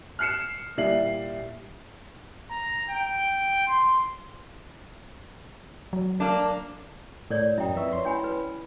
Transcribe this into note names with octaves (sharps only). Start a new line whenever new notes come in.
F6 F#6 C7 C#7 E7
A#2 G3 E4 D5 C7 F#7
A#5
G5
C6
F#3
A#3 D4
A2 A#4 C#5 D5
F#2 E4 D#5 G5 A#5
F2 B4 E5 C#6
E4 C#5 C6
C#4 G#5 B5
B4